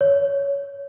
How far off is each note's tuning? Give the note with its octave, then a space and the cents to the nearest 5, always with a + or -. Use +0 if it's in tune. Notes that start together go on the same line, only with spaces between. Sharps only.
C#5 +15